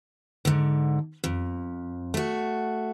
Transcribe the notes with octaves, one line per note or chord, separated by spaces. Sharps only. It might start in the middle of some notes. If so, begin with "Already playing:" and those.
G#2 D3
F2
A3 F#4